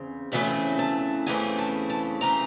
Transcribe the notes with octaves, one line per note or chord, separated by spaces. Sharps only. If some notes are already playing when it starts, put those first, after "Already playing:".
Already playing: E2 C#3 C4
E2 C#3 E3 A3 C4 E5
A5
E2 C#3 E3 A3 C4 G#5
A5
A5
C#3 E3 A3 C4 A#5